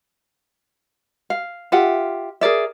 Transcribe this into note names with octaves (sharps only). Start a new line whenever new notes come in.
F5
F4 G4 E5 F#5
G#4 A#4 D5 E5